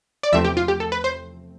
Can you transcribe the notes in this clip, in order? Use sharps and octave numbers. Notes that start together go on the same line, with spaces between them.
D5
E2 C3 F3 A3 C4 E5
G4
F4
G4
A4
B4
C5